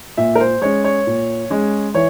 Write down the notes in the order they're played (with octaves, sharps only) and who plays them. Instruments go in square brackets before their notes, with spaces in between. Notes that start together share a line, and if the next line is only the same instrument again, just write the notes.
[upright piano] A#2 E5
A#4
C5
G#3 C#4 C#5
C#5
A#2
G#3 C#4
E3 C#5